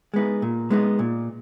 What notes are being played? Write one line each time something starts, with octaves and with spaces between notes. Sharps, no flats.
G#3 B3 D#4
A#2
G#3 B3 D#4
A#2